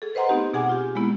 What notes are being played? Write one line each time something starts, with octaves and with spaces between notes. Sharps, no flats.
G#4 A4
B4 C5 D#5 F#5 A#5 C6
A3 B3 C4 D#4 G4
B2 G#4 F#5 G#5 D6
F4 G4
G#3 A#3 B3 E4